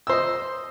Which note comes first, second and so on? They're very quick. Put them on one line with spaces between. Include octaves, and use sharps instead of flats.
E6 C5 D#5